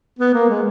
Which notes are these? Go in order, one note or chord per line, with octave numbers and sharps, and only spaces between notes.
B3
A#3
G#3